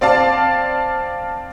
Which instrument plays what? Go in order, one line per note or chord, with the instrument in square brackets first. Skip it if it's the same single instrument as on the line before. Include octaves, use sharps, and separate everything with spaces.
[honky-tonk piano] C4 D5 F5 A5